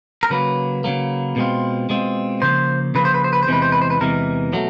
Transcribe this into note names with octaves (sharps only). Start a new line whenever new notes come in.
A#4
C#3 F#3 A#3 B4
C#3 F#3 A#3
B2 G#3 C4 F4
B2 G#3 C4 F4
C#3 F3 A#3 C5
C#3 F3 A#3 B4
C5
B4
C5
B4
C5
E2 C3 E3 G#3 B4
C5
B4
C5
B4
E2 C3 E3 G#3 A#4
B2 F#3 A3